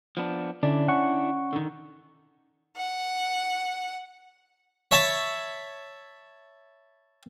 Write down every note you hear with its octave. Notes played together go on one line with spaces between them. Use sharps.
F3 B3 D4
D3 C#4 D4 E4 D5
C#4 F#5 C#6
D3 D#3
F#5
C#5 E5 A5 B5